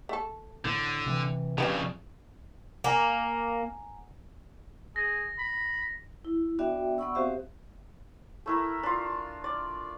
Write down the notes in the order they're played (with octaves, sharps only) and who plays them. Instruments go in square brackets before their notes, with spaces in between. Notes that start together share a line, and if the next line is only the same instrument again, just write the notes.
[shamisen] A3 A4
[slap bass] A2 [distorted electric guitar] D3
[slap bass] C3 E3
[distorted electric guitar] F2 C#3 [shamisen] D4 G4 B4
[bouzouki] A#3 [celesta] F#5 G#5 A#5
[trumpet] G#4 [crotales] A#6
[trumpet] B5
[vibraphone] E4
B3 D4 F#4 D5 E5 G5
B3 D5 F#5 B5 C#6 E6
C4 F#4 G4 C5 E5 F5
[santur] A3 E4 A#4
D4 F4
D5